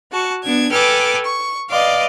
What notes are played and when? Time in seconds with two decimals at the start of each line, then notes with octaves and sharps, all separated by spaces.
0.12 F#4 A5 C#6
0.43 B3 D4 G#6
0.71 A4 B4 G5 G#5 D6 F6
1.25 C#6
1.69 B4 D5 D#5 F5 C6 D6